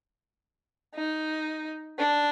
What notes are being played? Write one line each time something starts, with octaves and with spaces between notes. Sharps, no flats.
D#4
D4